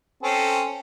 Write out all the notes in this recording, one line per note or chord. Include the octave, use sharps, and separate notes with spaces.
C4 C#4 A4